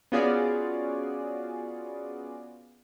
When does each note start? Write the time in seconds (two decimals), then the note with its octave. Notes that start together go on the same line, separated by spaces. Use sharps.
0.12 B3 C#4 F4 F#4 G#4 D5